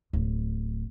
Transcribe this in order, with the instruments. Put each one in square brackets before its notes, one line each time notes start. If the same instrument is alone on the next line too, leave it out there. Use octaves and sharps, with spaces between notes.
[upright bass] D1